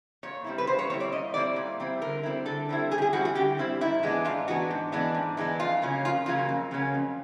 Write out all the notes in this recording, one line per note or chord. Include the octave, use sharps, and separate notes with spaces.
A#2 C#5
G3 C4 E4
B4
A#2 C5
C#5
G3 C4 E4 C#5
D5
A#2 D#5
G3 C4 E4 D5
A#2
G3 C4 E4
D3 A#4
G3 C4 E4
D3 A4
G3 C4 E4
D3 G#4
G4
G#4
G3 C4 E4 F#4
F#4
D3 G4
G3 C4 E4
G#2 E4
E3 G#3 B3 D4
G#2 F4
E3 G#3 B3 D4 F#4
G#2
E3 G#3 B3 D4
G#2
E3 G#3 B3 D4
F2 F4
C#3 F#3 A#3 C#4
F2 F4
C#3 F#3 A#3 C#4 F4
F2
C#3 F#3 A#3 C#4
F2